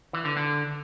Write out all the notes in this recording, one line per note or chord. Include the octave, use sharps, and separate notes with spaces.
E3
D3
D3